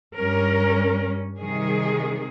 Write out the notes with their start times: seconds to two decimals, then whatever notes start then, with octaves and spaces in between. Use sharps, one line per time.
0.16 G2 G3 C#4 A#4
1.39 C3 D#3 G3 G#4